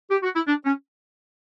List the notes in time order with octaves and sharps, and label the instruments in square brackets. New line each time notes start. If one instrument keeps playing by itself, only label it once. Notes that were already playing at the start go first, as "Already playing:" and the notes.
[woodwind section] G4
F#4
E4
D4
C#4